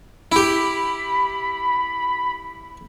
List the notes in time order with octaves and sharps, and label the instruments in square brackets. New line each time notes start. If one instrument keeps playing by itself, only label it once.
[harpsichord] E4 G4 [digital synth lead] B5